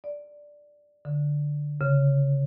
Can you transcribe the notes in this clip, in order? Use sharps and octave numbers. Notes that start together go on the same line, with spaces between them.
D5
D3
C#3